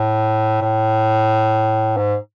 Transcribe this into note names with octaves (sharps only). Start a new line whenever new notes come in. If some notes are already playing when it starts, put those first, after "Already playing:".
Already playing: A2
A2
G#2